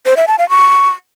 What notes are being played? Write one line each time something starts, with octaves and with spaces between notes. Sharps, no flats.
C5
E5
A5
F5
C#6